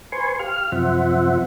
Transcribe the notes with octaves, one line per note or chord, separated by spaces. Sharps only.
B4 C5 G#5 C6 C#6
G4 F5 F6
F#2 C3 F3 C5 E5 F#5